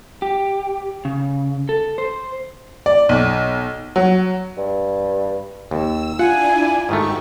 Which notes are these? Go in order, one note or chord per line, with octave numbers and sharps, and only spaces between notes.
G4
C#3
A4
C5
D5
B1
F#3
G2
D#2 E6
D4 E4 F4 F#5 G#5
G#2 D#3 A3 F#4 G4 C#6